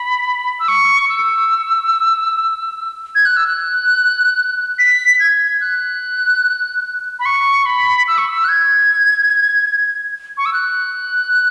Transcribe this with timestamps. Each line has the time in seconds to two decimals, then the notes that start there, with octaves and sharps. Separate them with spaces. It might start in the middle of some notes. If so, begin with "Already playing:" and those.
Already playing: B5
0.59 E6
0.68 C#6
1.09 E6
3.15 G#6
3.25 F#6
3.37 E6
3.47 F#6
4.79 B6
5.20 G#6
5.61 F#6
7.19 B5
7.26 C#6
7.66 B5
8.08 E6
8.18 C#6
8.29 E6
8.44 F#6
8.49 G#6
10.37 C#6
10.46 E6
10.53 F#6